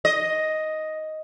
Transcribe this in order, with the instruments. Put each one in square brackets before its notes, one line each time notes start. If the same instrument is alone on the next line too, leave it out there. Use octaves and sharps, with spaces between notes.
[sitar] D#5